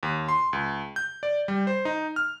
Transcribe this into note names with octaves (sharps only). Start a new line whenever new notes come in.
D#2
C6
C#2
G6
D5
G3
C5
D#4
F6